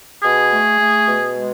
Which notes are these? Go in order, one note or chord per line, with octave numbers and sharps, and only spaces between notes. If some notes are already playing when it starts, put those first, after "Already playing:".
B2 G#4
A3
A3
B2
G#3